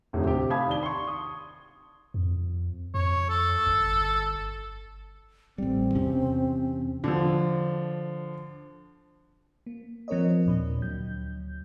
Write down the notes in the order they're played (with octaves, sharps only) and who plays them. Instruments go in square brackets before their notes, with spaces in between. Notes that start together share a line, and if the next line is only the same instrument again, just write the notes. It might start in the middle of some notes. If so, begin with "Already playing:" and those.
[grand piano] F1 A2 D3 D#4
C3 G4
F5 A5 B5 D#6 G#6
D#3 D5 G7
C6 C#6
D#6
[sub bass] F2
[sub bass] F2 [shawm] C#5
[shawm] A4
[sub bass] G1
[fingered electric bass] A1 G3 [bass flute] C4
[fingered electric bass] E2 C3 C#4
[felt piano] D3 F3
[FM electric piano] A#3
F3 C4 A#4 C#5 D#5
D#2 A#2 D4
D2 F#3 G6